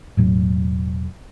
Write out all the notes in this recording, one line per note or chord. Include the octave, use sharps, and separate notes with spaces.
E1 A2 F#3